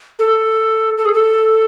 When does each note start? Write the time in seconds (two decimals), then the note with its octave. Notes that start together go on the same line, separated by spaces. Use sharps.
0.19 A4
0.98 A4
1.05 G#4
1.14 A4